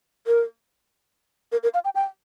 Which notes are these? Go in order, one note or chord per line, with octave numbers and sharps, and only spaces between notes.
A#4
A#4
A#4
F5
G5
G5